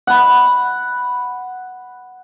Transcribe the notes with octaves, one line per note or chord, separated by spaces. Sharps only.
F#5 B5